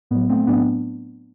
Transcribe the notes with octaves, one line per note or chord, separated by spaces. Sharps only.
A2 F#3 B3
A3 C4
A2 F#3 B3 D4